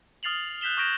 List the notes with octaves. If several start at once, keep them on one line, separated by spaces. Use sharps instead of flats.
D#6 F6 A6 C7 F7 F#7
F#6 G6 B6 E7 G7
C#6 D#6 G6 A#6 D7 E7